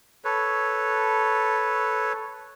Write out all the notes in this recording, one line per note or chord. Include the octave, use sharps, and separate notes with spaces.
A4 B4 C#5